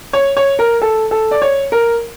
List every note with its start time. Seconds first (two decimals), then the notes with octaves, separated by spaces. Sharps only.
0.13 C#5
0.37 C#5
0.59 A#4
0.82 A4
1.11 A4
1.31 D5
1.42 C#5
1.72 A#4